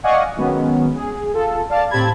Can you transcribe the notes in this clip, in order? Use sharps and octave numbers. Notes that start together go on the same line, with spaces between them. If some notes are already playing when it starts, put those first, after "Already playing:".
D5 D#5 F5 F#5 G#5 C#6
D#3 F#3 G#3 B3 C#4
G#4
F4 A4
D5 F5 A5
A2 C4 G4 A5 B5 G#6